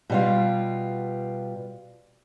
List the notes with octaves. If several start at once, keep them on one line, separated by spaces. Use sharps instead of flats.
B2 G3 F4